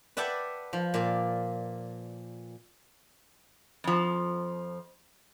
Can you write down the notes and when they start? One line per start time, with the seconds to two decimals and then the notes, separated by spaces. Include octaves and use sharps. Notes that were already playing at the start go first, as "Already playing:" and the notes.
0.17 B4 D5 E5 F#5 G5 A5
0.73 F3
0.94 A#2 D5
3.84 F2 F3